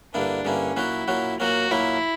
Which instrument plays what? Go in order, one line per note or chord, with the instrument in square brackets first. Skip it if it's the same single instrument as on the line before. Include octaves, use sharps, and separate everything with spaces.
[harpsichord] G2 D3 A#3 E4 [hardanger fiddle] D4
[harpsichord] G2 D3 A#3 E4 [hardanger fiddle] C#4
[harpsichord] A#2 F#3 C#4 F#4 [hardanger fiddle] E4
[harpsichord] A#2 F#3 C#4 F#4
[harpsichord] A#2 F#3 A#3 C#4 [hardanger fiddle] F#4
[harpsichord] A#2 F#3 A#3 C#4 [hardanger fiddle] E4